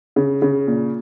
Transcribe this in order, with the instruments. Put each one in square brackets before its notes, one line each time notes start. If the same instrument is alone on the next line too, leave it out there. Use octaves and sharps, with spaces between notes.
[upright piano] C#3
C#3
A#2